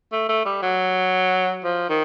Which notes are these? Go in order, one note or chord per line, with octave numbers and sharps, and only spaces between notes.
A3
A3
G3
F#3
F3
D#3